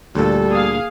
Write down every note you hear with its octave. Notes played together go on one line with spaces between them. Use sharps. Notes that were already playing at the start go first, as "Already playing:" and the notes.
D2 A#2 G3 A4
A#3 G#4 F5